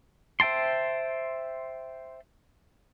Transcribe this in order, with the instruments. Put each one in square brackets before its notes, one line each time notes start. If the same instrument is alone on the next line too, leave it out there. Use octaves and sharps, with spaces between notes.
[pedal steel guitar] C5 E5 G5 A5 C6